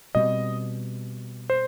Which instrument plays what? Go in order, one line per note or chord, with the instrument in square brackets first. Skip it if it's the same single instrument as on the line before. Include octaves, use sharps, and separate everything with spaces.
[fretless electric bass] B2 G3 C4 [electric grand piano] D#5
[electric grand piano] C5